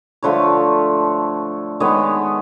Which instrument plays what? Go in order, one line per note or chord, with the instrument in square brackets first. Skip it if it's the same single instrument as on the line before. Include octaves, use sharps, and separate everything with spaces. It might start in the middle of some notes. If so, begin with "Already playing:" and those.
[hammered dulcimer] D3 F3 A3 B4 C#5
D#3 G#3 B3 C#5 D#5